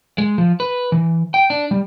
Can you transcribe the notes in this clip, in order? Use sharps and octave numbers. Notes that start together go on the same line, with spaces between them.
G#3
F3
B4
E3
G5
D4
G3